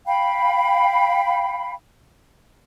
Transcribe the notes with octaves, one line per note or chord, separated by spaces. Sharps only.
F5 G5 B5